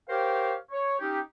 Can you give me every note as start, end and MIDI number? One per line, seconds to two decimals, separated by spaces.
0.09 0.54 67
0.09 0.54 70
0.09 0.54 72
0.09 0.54 73
0.09 0.54 77
0.09 0.54 79
0.71 1.00 73
1.00 1.19 61
1.00 1.19 63
1.00 1.19 67